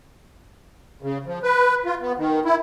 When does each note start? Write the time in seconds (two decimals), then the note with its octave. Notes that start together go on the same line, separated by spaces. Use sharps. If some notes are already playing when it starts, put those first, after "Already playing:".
1.02 C#3
1.26 F3
1.43 B4
1.85 F4
2.01 B3
2.18 D#3
2.45 E4